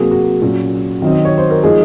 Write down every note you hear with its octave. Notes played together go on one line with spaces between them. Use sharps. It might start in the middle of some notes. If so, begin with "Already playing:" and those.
Already playing: C3 F#3 A#3 F#4 G#4
F#4
A#2 F#3 C#4
D#3 F#3 C4 D#4
D#5
C#5
C5
A#4
F3 G#3 D#4 G#4